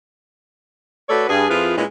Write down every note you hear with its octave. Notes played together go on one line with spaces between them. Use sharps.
A3 F#4 A4 B4 C#5 D5
G2 G#4
F2 F3 E4 F4 G#4 B4
A#2 G#3 B3 C#4 D#4 E4